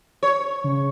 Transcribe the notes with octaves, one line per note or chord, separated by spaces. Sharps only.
C#5
C#3